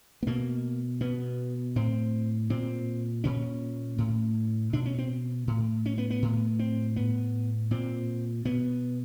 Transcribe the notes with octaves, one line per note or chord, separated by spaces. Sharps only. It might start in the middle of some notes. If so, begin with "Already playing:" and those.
B3
B2 A#3
B2 B3
A2 C4
A#2 C4
A#2 C#4
A2
B2 D4
C#4
C4
A2
C#4
B3
B3
A2
C4
A2 B3
A#2 C4
B2 B3